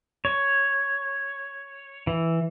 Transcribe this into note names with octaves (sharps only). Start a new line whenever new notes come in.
C#5
E3